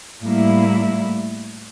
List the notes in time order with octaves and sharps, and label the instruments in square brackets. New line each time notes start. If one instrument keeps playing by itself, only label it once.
[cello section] A2 G3 A#3 E4